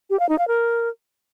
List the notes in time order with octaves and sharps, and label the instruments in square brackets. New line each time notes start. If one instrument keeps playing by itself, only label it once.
[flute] G4
F5
D#4
F5
A#4